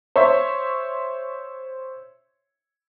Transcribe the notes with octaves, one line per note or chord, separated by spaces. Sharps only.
C5 C#5 E5